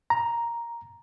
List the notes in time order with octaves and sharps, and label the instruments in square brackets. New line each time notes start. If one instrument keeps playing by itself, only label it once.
[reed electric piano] A#5